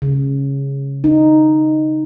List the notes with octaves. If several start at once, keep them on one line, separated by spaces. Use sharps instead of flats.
C#3
D#4